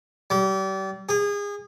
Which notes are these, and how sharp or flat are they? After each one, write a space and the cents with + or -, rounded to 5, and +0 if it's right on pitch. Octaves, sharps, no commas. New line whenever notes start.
G3 -35
G#4 -30